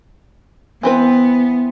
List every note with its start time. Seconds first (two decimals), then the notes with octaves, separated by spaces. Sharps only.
0.83 E3 B3 C4 B4